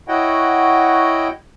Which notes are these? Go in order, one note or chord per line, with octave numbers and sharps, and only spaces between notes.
E4 F#4 C#5 D#5 F#5 G5